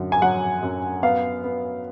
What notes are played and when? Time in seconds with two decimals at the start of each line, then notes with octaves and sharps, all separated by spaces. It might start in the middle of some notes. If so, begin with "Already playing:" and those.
Already playing: F#2 D3
0.12 G#5
0.22 F#3 F#5
0.63 F#2
1.03 B3 F5
1.44 B3